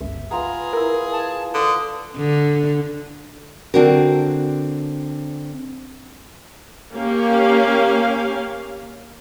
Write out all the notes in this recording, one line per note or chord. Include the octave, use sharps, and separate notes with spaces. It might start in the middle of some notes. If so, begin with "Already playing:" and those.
G1 C#2 E5
B3 F4 G#4 B4 A#5
E4 A#4
A5
D3 D#6
D3
D3 C4 D4 F#4 A#4
A#3 C#4 G4 F5